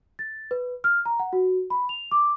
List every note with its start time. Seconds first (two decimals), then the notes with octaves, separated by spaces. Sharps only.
0.19 A6
0.51 B4
0.84 F6
1.06 A#5
1.19 F#5
1.33 F#4
1.70 B5
1.89 F7
2.11 D6